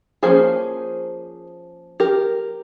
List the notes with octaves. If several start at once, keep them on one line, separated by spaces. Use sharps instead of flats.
F3 A#3 C#4 G#4 C5
G4 A#4